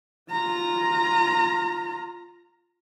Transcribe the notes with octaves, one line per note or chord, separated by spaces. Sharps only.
F4 A#5